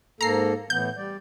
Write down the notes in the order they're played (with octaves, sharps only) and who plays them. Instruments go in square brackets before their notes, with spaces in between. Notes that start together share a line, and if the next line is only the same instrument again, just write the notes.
[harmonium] G#2 A#3 A4 [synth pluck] A#5 C7
[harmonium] A2 E3 B3 [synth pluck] G6
[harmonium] G3 D5